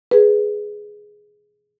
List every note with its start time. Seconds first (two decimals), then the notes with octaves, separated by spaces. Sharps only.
0.11 G#4 B4